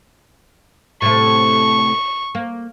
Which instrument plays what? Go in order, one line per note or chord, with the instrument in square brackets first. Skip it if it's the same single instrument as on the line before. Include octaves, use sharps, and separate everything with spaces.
[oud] A2 C3 A3 [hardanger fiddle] C#6
[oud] A#3